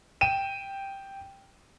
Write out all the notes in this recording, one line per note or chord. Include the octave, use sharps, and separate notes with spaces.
G5 D#7 E7